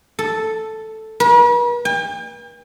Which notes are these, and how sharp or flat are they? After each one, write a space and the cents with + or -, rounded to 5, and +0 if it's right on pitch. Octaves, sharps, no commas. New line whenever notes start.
A4 +0
B4 -45
G5 +45